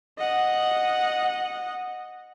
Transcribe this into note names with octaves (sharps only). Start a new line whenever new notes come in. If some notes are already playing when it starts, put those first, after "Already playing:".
D#5 F#5